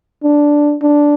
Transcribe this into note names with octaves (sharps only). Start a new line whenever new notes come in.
D4
D4